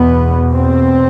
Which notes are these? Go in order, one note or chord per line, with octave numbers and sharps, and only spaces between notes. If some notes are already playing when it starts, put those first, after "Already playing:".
Already playing: E2 B2 B3
C4